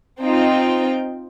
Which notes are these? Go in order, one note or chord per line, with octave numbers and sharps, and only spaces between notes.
C4 D#4 F4 G5